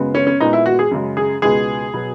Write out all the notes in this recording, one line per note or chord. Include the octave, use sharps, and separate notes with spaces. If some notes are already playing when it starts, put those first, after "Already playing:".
Already playing: F#2 C#3 G#3 B3
C#4
C#4
A#2 G#3 B3 D#4
E4
F#4
G#4
F#2 C#3 G#3
G#4
C#2 B2 G#3 B3 G#4
B2 F#3 B3